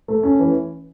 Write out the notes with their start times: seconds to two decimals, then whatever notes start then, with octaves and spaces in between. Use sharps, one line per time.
0.08 A3
0.23 C#4
0.39 E3